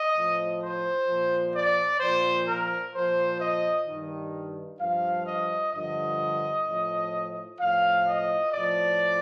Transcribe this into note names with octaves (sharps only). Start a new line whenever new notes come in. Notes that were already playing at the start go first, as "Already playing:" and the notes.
Already playing: D#5
A2 F3
C5
A#2 F3
D5
A#2 F3 C5
A#4
A#2 F3 C5
D#5
G2 D#3
G2 F3 F5
D#5
G2 D3 F3 D#5
A2 F3
A2 F3 F5
D#5
A2 F3 D5